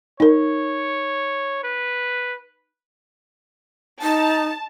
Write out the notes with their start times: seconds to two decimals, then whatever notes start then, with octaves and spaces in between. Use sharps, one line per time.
0.20 D#4 A#4 C#5
1.63 B4
4.02 D#4 A5